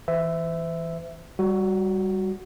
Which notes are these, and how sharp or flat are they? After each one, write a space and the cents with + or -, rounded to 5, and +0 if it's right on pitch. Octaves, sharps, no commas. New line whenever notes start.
E3 +0 C5 -45 E5 +0
G3 +0 F#4 +0